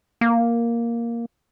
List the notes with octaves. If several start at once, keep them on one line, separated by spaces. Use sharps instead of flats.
A#3